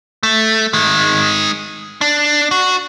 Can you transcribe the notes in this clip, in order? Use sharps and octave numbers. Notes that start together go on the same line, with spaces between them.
A3
D#3 G#3
D4
F#4